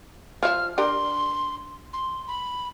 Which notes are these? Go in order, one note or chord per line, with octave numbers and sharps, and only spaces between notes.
F3 E5 F6
D4 G4 A#4 C6
C6
B5